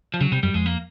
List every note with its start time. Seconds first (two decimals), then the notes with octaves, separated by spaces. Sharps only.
0.14 F3
0.20 C#3 F#3
0.32 C3 G3
0.43 F#2 G3
0.54 F2 G#3
0.66 A#3